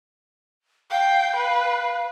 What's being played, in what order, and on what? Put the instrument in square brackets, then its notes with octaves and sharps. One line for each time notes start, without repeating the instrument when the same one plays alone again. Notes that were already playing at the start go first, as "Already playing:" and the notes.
[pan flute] F5 [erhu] G5
[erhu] B4